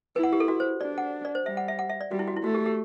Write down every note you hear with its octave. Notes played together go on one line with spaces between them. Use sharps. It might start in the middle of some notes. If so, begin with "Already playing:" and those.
E4 B4
F#5
G4
A4
F#4
C5
D4 D5
F#5
D5
C5
G3 E5
F#5
E5
F#5
E5
D5
G3 F#4
E4
F#4
E4
A3 F#4
G4
G4